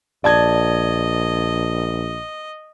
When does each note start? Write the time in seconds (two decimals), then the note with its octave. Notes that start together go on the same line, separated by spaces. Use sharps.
0.24 A#1 D5 D#5 A5 G#6